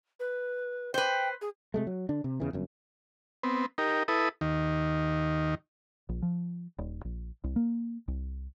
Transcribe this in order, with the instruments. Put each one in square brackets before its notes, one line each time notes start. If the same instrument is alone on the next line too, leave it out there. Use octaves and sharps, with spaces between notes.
[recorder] B4
[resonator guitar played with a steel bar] B4 C5 [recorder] G5
[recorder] G#4
[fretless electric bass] C3 G#3 A3
F#3
D3 D4
C3
E2 C#3 E3
G1 F#2
[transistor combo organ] B3 C4
D#4 G4 A#4
E4 A4 B4 D#6
D#2 D#3
[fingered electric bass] A#1
F3
D#1
A#1
C2
A#3
C2